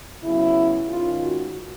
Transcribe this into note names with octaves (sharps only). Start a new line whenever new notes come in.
C#3 F#3 B3 E4
G#2 D#3 G#3 C#4 F4
F#4